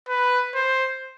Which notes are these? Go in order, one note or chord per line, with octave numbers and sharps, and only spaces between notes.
B4
C5